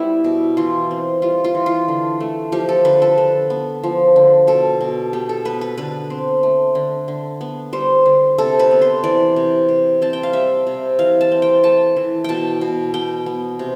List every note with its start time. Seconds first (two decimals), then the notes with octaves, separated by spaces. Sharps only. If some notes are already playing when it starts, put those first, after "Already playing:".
Already playing: G3 B3 E4 G4
0.24 B2
0.57 E3 F4
0.91 C4
1.22 G3 F4
1.44 F4
1.55 E3
1.66 F4
1.88 D3
2.20 A3
2.52 F3 G4
2.69 A4
2.85 D3 B4
3.02 A4
3.18 D3
3.50 B3
3.84 F3
4.16 D3
4.47 B2 A4
4.81 B2
5.13 B3 G4
5.29 A4
5.45 B3 B4
5.61 B4
5.78 D3 B4
6.10 C4
6.43 A3
6.75 D3
7.08 D3
7.41 B3
7.73 G3 C5
8.06 D3
8.38 C3 A4
8.59 B4
8.71 B3
8.82 C5
9.04 E3 D5
9.36 C3
9.69 C3
10.02 C4 A5
10.13 G5
10.23 F5
10.33 G3 E5
10.67 C3
10.99 E3 F5
11.21 A5
11.32 C4
11.42 G5
11.63 A3 A5
11.97 E3
12.24 B2 G5 A5
12.61 B2
12.94 B3 G5
13.26 B3
13.59 C3